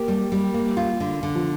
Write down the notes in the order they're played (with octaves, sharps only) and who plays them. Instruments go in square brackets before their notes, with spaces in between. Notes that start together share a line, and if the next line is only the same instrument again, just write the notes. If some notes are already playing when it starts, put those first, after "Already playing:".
Already playing: [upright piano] A#3 [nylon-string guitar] G4
[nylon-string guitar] G3
G3
A#3
F4
D3
D3
[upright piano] F3